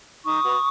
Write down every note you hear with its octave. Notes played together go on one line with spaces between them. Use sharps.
D#4 C#6 D#6
F#4 B4